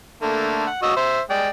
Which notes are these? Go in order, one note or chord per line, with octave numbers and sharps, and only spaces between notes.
D3 A3 A#3
F#5
F#4 D#5 E6
C5 E5
G#3 D5 G5